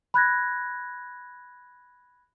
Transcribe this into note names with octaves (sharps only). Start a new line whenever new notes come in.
B5 F#6 G#6 A#6